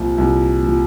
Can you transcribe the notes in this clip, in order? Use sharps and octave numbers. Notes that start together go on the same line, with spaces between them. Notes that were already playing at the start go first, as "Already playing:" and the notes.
Already playing: C2 A#2 F3
C2
A#2 F3